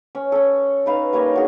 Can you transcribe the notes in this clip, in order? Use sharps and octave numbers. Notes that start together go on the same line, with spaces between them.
C#4
C#4 A4
D#4 B4 F5
G3 A#3 C#5 D#5
D4 F#4 G#4